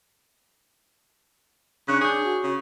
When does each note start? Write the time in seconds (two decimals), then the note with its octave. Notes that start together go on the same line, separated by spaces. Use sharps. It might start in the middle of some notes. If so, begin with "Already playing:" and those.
1.88 C#3 D4 C#5 F#6
2.01 D4 G#4 D#6 G6
2.24 F#4
2.43 C#3